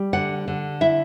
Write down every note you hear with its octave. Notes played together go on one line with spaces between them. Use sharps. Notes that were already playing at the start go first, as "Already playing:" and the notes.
Already playing: G3
D3 F#5
D3
E4 E5